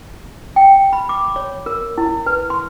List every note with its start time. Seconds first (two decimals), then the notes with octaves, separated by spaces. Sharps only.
0.56 G5
0.93 B5
1.09 D6
1.36 C#5
1.66 A#4
1.98 E4
2.26 B4
2.50 C6